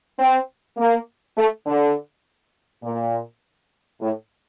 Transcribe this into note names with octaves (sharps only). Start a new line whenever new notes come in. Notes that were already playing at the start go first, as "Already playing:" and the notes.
C4
A#3
A3
D3
A#2
A2